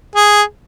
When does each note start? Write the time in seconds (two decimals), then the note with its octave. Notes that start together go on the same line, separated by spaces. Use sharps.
0.15 G#4